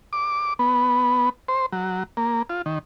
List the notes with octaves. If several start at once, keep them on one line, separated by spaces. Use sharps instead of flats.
D6
B3
C5
F#3
A#3
F4
D#3